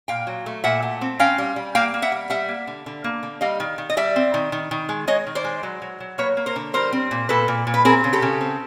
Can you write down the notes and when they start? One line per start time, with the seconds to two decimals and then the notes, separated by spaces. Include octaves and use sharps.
0.08 A#2 F5 G5
0.27 F#3
0.46 A3
0.64 A#2 E5 F#5
0.83 A3
1.01 C4
1.19 C#4 F5 G5
1.38 G3
1.56 G3
1.75 A#3 F5 G5
1.94 A#3
2.02 E5 F#5
2.12 G3
2.30 G3 E5 F#5
2.49 A#3
2.67 D3
2.86 D3
3.04 A#3
3.23 D3
3.41 G3 D#5 F5
3.60 D#3
3.78 D#3
3.90 D#5
3.97 G3 D5 E5
4.16 C4
4.34 D#3
4.52 D#3
4.71 D#3
4.89 G#3
5.07 G#3 C#5 D#5
5.27 D#3
5.35 C5 D5
5.44 G#3
5.63 F#3
5.82 F#3
6.00 F#3
6.18 A#3 B4 C#5
6.37 A#3
6.46 A#4 C5
6.56 D3
6.73 G3 A#4 C5
6.93 C4
7.11 A#2
7.29 A#2 A4 B4
7.48 A#2
7.67 A#2
7.74 B4
7.85 C4 G#4 A#4
8.04 C#3
8.13 G4 A4
8.22 C#3
8.41 C4